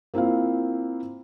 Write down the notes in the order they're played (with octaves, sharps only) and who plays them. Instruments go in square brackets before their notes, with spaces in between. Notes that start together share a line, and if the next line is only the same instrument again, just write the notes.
[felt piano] A#3 C4 E4 F4 F5